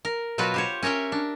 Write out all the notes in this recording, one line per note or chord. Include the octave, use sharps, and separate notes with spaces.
A#4
B2 F#3 F4 F#4 B4
G4 C5 C#5
C#4 A#4 C#5 E5 G5
D4